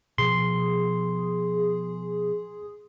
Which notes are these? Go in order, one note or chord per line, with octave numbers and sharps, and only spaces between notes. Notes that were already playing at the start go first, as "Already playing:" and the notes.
B2 F3 G#4 C6